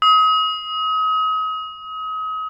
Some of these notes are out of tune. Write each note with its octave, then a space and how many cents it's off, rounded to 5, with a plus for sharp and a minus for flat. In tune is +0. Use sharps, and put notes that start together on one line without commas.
D#6 +35